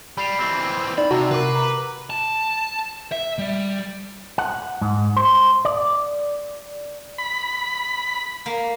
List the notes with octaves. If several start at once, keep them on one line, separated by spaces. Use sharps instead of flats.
G3 B5 C7
E3 C4
D#4 D5 B5
C3 F#4 F#5 A5 A#5
C3 A#4 B4 D6
A#5
A5
E5
G3
F#5
G#2
C5
D5
B5
A#3